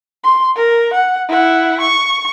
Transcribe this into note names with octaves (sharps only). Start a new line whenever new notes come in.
C6
A#4
F#5
E4 F#5
C#6